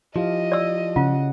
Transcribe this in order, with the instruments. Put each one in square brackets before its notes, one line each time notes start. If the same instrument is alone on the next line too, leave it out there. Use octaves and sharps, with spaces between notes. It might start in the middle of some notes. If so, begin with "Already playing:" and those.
[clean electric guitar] F3 [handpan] E4 G4 F5 [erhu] D#5
[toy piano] D5 E6
[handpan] C#3 C#4 F#5 [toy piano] F4